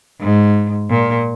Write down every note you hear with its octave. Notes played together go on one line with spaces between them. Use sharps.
G#2
A#2